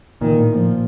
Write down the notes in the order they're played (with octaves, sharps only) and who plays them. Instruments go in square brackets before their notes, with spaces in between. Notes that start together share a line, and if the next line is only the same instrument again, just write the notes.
[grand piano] A#2 [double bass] D#3
[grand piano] A2
[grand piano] A#2 [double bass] F3